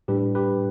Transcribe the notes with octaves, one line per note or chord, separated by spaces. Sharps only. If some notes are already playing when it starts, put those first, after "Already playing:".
A2 G3 D4 G4 B4
G4 B4